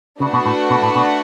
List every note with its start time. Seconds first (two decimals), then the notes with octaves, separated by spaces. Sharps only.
0.20 C#3 A3 D4 F#4 B4 F#5
0.33 B2
0.46 A2
0.70 B2
0.83 A2
0.95 B2